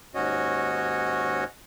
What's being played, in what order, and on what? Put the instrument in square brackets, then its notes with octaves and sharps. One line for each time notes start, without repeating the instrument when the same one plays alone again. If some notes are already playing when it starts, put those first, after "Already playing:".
[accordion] D#2 G#2 C#4 F#4 C#5 D#5